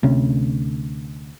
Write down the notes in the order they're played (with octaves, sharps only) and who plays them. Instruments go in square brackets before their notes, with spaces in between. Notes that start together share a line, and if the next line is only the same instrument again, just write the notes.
[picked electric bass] D2 C3 C#4